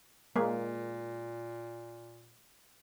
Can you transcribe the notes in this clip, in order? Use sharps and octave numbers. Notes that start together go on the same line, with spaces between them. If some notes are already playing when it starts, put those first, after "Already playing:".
A#2 G#3 A#3